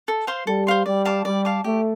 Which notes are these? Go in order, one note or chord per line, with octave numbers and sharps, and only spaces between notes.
A4
C5 F5 C6
G3 A4
C5 F5 C6
G3 D5
F5 A5 D6
G3 D5
F5 A5 D6
A3 G4